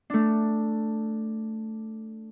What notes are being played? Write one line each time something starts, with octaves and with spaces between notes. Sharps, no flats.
A3 D4